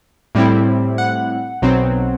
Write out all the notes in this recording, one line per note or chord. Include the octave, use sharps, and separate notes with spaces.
A2 G3 C4 E4
F#5
B1 B2 F#3 C4